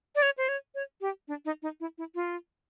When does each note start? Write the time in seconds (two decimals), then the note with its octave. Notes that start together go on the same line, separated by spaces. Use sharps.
0.16 D5
0.22 C#5
0.38 C5
0.49 C#5
0.75 C#5
1.01 G4
1.28 D4
1.45 D#4
1.62 D#4
1.80 E4
1.98 E4
2.15 F4